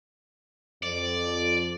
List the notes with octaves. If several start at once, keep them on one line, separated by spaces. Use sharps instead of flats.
F2 D5